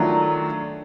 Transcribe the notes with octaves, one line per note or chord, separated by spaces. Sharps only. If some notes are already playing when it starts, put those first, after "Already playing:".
Already playing: D#3 F#3 A3 D4 F4